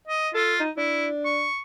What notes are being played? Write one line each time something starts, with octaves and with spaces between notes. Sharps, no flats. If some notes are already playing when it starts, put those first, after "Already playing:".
D#5
F4 A4
D#4
D4 E4
C#6